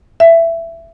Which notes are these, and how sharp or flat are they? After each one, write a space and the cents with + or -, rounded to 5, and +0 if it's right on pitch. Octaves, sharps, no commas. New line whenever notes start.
E5 +15